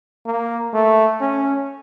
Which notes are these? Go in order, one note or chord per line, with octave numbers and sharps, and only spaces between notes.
A#3
A3
C#4